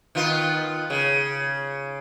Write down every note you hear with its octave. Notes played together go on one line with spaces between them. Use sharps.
D#3 B3 F4
C#3